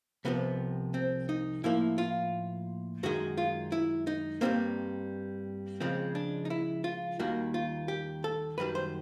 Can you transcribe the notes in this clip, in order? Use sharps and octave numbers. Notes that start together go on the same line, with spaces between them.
C2 C3 F3 B3
C4
D#4
A2 F3 A#3 E4
F4
F#2 D#3 G#3 F#4
F4
E4
D#4
G2 D#3 G3 A#3 C4
C#2 C#3 F3 G#3 C4
D4
D#4
E4
F4
D#2 D#3 G3 A#3 F#4
F4
G4
A4
F#2 D#3 G3 B4
C5